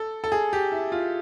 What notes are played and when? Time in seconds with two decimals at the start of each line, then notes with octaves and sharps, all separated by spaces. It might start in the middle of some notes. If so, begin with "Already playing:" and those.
Already playing: A4
0.24 A4
0.32 G#4
0.53 G4
0.72 E4
0.92 F4